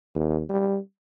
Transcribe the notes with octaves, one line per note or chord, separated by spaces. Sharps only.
D#2
G3